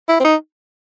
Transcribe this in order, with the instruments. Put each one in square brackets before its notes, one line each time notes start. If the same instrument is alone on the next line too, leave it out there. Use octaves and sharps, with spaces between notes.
[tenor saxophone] E4
C4
D#4